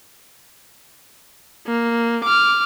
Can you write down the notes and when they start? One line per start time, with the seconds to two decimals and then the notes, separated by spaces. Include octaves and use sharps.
1.67 A#3
2.24 D6 F6